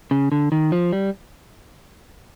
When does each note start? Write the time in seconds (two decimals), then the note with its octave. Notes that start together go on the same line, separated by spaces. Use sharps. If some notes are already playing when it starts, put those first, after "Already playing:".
0.11 C#3
0.32 D3
0.52 D#3
0.72 F3
0.93 G3